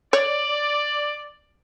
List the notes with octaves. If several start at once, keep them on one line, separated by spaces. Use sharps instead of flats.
C#5 D5